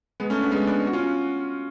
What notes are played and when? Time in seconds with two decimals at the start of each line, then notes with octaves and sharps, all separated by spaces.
0.20 G#3 B3
0.30 A3 C#4
0.41 B3 D4
0.52 G#3 B3
0.67 B3 D4
0.87 F#4
0.93 C#4 F4